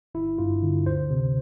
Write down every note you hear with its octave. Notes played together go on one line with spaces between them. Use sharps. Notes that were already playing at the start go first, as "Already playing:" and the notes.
G1 E4
G2 F4
D3
D2 C5
C3